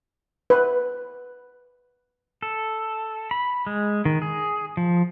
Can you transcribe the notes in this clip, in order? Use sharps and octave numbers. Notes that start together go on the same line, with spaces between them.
B4
A4
B5
G#3
D#3
G#4
F3